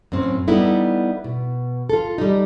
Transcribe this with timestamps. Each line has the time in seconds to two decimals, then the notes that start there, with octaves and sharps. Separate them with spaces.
0.12 F#2 A2 C4 C#4
0.48 G3 B3 D#4 E4 A4
1.24 B2
1.90 F4 A4
2.18 G3 D#4